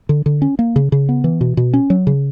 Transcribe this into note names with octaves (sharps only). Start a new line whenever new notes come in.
D3
D3
C#4
A#3
C#3
C#3
B3
E3
B2
B2
C#4
F#3
C#3